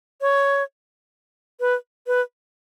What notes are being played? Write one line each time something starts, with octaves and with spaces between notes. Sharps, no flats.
C#5
B4
B4